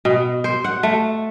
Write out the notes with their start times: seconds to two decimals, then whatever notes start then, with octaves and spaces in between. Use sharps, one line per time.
0.05 B2
0.44 C5
0.64 F#5
0.83 A3